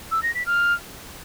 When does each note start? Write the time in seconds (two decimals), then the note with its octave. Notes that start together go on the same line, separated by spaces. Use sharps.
0.11 E6
0.23 A#6
0.35 B6
0.46 F6